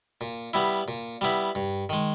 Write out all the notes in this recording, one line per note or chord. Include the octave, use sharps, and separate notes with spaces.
A#2
G3 B3 E4
A#2
G3 B3 E4
G2
D#3 G#3